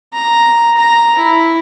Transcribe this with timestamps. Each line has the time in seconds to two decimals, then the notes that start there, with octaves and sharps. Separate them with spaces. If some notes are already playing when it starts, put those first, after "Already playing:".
0.13 A#5
0.76 A#5
1.17 E4